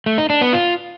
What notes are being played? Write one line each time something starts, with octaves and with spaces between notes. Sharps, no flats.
A3
D#4
D4
B3
F4